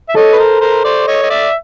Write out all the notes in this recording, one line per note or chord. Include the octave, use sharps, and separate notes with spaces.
E5
A4 C#5 D#5
B4
A#4 C5
A#4 C5
C5 D5
C#5 D#5
D#5
D5 E5